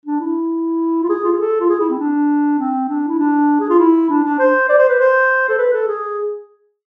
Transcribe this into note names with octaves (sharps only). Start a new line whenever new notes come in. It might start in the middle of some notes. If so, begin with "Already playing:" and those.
D4
E4
F4
G#4
F4
G#4
A4
F4
G#4
E4
C4
D4
C4
D4
E4
D4
G#4
F4
E4
D4
D4
C5
D5
C5
B4
C5
A4
B4
A4
G#4